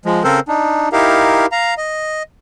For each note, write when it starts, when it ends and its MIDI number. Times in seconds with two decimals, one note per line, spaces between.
0.06 0.23 53
0.06 0.23 56
0.24 0.40 49
0.24 0.40 60
0.24 0.40 69
0.24 0.40 70
0.24 0.40 72
0.48 0.89 62
0.48 0.89 63
0.92 1.46 63
0.92 1.46 64
0.92 1.46 67
0.92 1.46 70
0.92 1.46 77
1.52 1.74 77
1.52 1.74 82
1.78 2.23 75